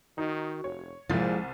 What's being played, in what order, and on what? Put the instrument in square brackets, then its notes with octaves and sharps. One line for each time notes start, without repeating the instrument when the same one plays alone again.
[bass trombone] D#3 [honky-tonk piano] D#4 [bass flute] F#4
[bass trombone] F1 [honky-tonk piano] C#5
[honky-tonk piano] C2 C5 A6 [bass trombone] A#2 [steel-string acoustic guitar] F3 E4 [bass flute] G#3